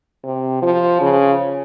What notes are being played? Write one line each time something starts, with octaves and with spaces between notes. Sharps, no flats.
C3
F3
C#3